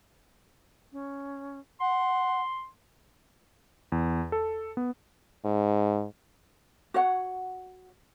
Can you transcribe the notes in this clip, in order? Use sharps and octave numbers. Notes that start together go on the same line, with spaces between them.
C#4
F#5 C6
E2
A4
B3
G#2
F#4 C#5 F#5